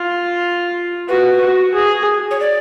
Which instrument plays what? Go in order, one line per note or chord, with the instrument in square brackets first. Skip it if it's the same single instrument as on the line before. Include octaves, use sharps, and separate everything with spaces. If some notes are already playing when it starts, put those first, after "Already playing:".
Already playing: [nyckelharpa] F4
[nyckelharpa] F#4 [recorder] B4
[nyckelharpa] F#4
G#4
[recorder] C#5
D5